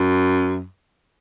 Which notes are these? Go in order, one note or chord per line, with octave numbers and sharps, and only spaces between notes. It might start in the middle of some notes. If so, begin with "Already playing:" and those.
Already playing: F#2